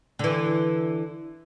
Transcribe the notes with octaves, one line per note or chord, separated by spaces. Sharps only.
D3 E3